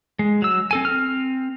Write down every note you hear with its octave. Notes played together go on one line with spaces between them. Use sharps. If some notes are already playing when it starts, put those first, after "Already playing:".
G#3
F#3 E6
C4 A4 G#5
C4 F6